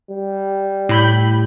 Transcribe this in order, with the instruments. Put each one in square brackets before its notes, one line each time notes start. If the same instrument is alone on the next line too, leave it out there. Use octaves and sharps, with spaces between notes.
[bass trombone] G3
[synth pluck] A2 B5 G6